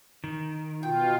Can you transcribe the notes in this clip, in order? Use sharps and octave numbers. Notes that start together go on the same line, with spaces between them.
D#3
B2 F4 G5